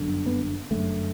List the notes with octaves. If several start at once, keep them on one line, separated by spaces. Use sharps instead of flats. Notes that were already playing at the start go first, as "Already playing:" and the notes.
Already playing: G1 F#2 D3
B3
G1 F#2 D3 A3